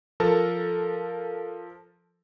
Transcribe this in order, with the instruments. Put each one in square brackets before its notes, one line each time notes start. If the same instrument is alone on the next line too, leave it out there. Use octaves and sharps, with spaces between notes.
[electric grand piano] F3 A4 A#4 A5